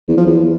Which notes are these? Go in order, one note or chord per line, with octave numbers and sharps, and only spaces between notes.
E2
F3
E2